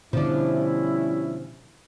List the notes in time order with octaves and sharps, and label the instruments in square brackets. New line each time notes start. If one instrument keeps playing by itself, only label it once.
[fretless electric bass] B2 D3 [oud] F3 D4 [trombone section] G3 C#4 E4